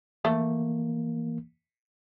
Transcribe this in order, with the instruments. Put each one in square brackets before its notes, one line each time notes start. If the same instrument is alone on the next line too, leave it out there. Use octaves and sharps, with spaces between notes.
[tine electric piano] E3 A#3 [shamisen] A3